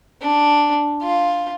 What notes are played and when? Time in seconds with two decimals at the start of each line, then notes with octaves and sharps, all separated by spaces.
0.21 D4
1.02 F4